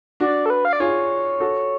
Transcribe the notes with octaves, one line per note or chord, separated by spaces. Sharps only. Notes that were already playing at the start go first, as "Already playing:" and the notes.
D4 F#4 D5
A4
B4
F5
D5
F4 G#4 C#5
F#4 A4